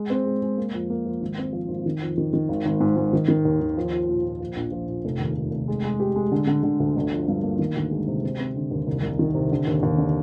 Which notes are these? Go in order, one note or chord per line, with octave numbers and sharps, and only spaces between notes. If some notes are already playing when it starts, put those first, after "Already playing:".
Already playing: G#3
C4
G#3
G#3
A#3
F2
A#3
F3
G#1
C4
F3
G#1
D#3
F2
D#3
D#3
G#1
G#1
G#2
G#2
D#3
D#3
D#2
D#2
F3
F4
A#2
A#2
F3
A#1
F3
A#2
F1
D#2
F1
F1
G#3
G#3
G4
G#3
D3
D3
D3
D2
G1
F3
G2
A#3
D#3
D2
G#3
C3
C4
C4
D3
D#2
C2
C2
D#3
C3
D3
D#2
D#2
D3